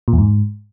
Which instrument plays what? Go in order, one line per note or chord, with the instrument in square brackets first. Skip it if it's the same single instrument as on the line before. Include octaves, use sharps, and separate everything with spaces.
[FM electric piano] A#2
E2
G#2